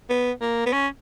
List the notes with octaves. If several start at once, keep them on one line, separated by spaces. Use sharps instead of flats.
B3
A#3
B3
C#4